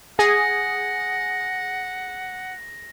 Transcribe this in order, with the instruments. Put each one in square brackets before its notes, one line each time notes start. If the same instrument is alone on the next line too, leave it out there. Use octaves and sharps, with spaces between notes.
[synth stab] G#4 [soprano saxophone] F#5 [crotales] A#6